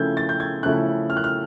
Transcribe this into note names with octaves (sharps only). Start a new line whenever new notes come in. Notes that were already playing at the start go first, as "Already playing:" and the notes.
Already playing: C#3 F3 A3 C#4 E4 G6 G#6
A6
G6
G#6
C#3 F3 A3 C#4 E4 F#6
F6
F#6
F6